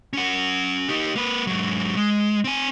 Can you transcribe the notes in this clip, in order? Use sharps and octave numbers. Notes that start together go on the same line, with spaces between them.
C#4 F#5
D#4 G4
A#3 B4
G#2 F#3
G#3
C4 G#5